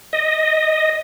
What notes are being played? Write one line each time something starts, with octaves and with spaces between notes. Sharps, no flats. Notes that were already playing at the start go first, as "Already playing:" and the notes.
D#5